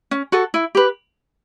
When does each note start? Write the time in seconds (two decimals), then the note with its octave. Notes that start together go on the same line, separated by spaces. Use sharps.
0.11 C#4
0.32 F#4 A4
0.54 E4
0.75 G4 B4